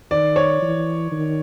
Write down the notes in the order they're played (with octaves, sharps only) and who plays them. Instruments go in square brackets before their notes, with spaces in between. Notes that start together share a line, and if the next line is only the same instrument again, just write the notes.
[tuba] D#3 [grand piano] D5
[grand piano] C#5
[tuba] E3
D#3